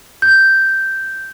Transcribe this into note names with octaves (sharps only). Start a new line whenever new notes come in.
G6